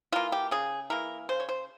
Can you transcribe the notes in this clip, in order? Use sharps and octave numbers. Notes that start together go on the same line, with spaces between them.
E3 A#3 F4
G4
C#3 G#4
E3 A#3 A#4
C#3 C5
C#5
C5